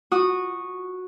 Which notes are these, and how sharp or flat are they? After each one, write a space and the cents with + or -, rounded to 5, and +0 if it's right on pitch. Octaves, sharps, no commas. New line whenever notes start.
F#4 -10 D#6 -15